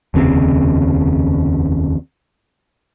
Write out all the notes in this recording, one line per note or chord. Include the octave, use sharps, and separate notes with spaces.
F1 D#2 C#3 C4